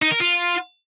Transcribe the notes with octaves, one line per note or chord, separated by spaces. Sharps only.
D#4
A#4
F4